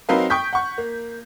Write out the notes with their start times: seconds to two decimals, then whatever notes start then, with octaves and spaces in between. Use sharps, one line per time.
0.09 F#3 C4 D#4 A#4 B4 F5
0.30 G5 C#6 D#6 G6 B6
0.53 F#5 C#6
0.78 A#3